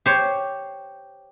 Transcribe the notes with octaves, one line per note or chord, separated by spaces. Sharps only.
G4 C5 C#5